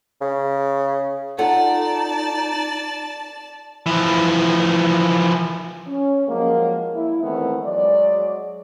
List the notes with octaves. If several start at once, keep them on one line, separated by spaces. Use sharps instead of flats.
C#3
D#4 F4 A4 D5 F#5 A5
E3 F3
C#4
F3 F#3 G#3 A#3
E4
D#3 E3 G#3 A3 B3 C4
F#3 G#3 G#4 D5